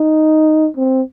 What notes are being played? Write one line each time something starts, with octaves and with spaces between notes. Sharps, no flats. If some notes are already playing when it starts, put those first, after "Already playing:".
Already playing: D#4
C4